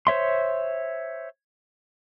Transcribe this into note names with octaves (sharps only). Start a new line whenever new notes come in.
C5 C#5 E5 C6